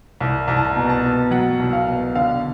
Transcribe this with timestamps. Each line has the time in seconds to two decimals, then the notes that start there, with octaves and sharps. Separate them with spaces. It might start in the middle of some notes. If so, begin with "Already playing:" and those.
0.20 C2
0.48 C2 A#5
0.57 A5
0.65 A#5
0.76 B2
0.89 A5
1.04 B2
1.31 F#3 F#5
1.60 C2
1.73 F5
1.87 B2
2.15 D3 F5